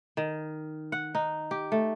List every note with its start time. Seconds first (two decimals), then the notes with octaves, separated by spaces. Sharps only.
0.17 D#3
0.92 F#5
1.15 D#4
1.51 G4
1.72 A3